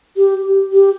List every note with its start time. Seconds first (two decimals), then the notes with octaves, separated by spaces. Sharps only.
0.17 G4
0.73 G4